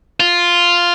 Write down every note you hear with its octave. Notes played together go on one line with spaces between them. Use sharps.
F4